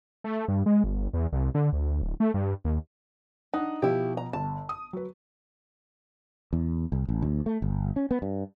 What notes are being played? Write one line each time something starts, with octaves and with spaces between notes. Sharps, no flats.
A3
G2
G#3
G1
E2
C2
D3
D2
D1
A3
G2
D#2
D4 D#4 F#5
B2 F3 E4 G4
A#5
G1 A5
D#6
F#3 B4
E2
C2
A1
D2
A3
G1
C#4
B3
G2